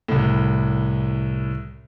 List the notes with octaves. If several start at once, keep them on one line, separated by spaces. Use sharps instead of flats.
C2 A2